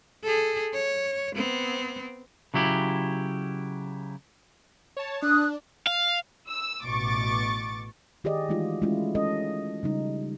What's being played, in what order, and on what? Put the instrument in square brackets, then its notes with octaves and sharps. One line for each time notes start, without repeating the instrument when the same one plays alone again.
[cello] G#4 A4
C#5
B3 C4
[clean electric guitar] C#3 F#3 E4 G4
[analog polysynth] C#5 A5
[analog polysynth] D4 [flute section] D#6 F#6
[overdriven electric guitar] F5
[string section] E6
A1 B2 C#6 D6 A6
[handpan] D#3 G4 G#4 D5 D#5
E3 G#3 A3 D#4 F4 F#4
G#3 A3 C#4 E4 F4
G#3 C#4 A4 D#5
C#3 G3 D#4